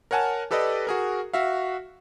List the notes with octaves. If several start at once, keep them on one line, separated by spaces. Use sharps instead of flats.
A#4 C#5 F#5 G#5 A5 F6
G4 A4 B4 D5 D#5
F#4 G#4 A#4
F#4 E5 F5